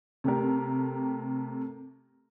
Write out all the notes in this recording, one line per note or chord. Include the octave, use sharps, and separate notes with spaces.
C3 A3 G4 A#4